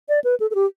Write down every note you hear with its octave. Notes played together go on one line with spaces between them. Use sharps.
D5
B4
A4
A4
G4